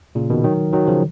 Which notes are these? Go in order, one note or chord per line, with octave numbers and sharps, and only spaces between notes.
A#2 C#3
B2 D#3
D#3 F#3
D#3 F#3
C#3 F3